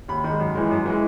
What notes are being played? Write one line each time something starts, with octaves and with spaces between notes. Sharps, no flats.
D#2 B5
D#3 G#3
F#2
E3 G#3
F#2
E3 G#3